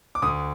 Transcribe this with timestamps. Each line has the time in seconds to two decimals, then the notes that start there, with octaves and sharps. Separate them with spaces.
0.15 D6
0.22 D2 D#6